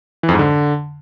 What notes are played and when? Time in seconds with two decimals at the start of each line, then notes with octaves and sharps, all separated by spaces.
0.23 E3
0.29 F2
0.34 G#2
0.39 D3